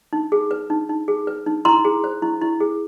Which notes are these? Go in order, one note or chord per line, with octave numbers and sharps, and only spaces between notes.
D#4
G#4
B4
D#4
D#4
G#4
B4
D#4
E4 A#5 C6
G#4
C5
E4
E4
G#4